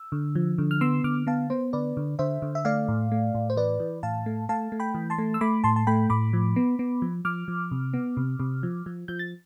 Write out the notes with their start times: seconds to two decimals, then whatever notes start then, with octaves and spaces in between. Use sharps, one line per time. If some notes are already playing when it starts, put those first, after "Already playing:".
Already playing: E6
0.12 D3
0.35 F3
0.58 D3
0.71 F6
0.81 B3 C6 E6
1.04 D3 D6 F6
1.27 B3 F5 A5
1.50 B3 C5
1.73 D3 B4 D5
1.97 D3
2.19 D3 C5 E5
2.42 D3
2.55 E5
2.65 A3 D5 F5
2.88 A2
3.12 A3
3.35 A2
3.50 C5
3.57 E3 B4 D5
3.80 E3
4.03 A2 F5 A5
4.26 A3
4.49 A3 F5 A5
4.72 A3
4.80 G5 B5
4.94 E3
5.10 A5 C6
5.18 A3
5.34 E6
5.41 A3 B5 D6
5.64 A2 A5 C6
5.76 A5
5.87 A3 G5 B5
6.10 A2 B5 D6
6.33 F3
6.56 B3
6.79 B3
7.02 F3
7.25 F3 D6 F6
7.48 F3
7.71 C3
7.93 B3
8.17 C3
8.40 C3
8.63 F3
8.86 F3
9.08 F3 G6
9.19 A6